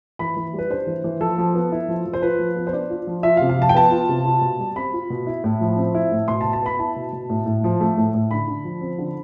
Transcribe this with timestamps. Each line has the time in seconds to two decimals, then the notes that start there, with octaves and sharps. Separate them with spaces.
0.19 E3 B5
0.37 E3
0.53 G3
0.59 B4
0.70 D4 C5
0.87 E3
1.04 E3
1.21 F3 A4
1.38 F3
1.55 B3
1.72 E4
1.88 F3
2.06 F3
2.13 C5
2.22 F4 B4
2.39 F3
2.56 B3
2.67 C5
2.73 D4 D5
2.90 F4
3.07 F3
3.23 F4 E5
3.37 F5
3.41 C3
3.49 F5
3.58 F3 A5
3.69 G5
3.75 B3 A5
3.91 F4
4.09 C3
4.25 F4
4.42 B2
4.59 G3
4.76 C4 B5
4.93 F4
5.10 B2
5.27 E4
5.44 A2
5.61 F3
5.77 C4
5.95 E4
6.12 A2
6.28 B2 C6
6.41 A5
6.45 B2
6.53 A5
6.63 B3 B5
6.79 E4 A5
6.96 B2
7.13 B2
7.30 A2
7.46 A2
7.64 F3
7.80 A3
7.97 A2
8.14 A2
8.31 D3 B5
8.47 D3
8.64 F3
8.81 C4
8.99 D3